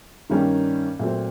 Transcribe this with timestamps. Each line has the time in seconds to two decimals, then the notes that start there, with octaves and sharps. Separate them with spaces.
0.30 G2 D#3 G3 A#3 C#4
0.99 A#2 F#3 A3 C4